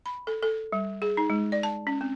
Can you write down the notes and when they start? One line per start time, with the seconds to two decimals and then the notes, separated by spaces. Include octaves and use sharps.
0.06 B5
0.27 A4
0.43 A4
0.72 G3
1.02 G#4
1.17 D#4
1.30 G#3
1.52 D5
1.63 A5
1.87 C#4
2.01 C4